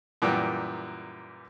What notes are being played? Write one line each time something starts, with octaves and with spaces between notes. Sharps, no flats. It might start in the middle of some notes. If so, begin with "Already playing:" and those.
F#2 A#2 E3 G3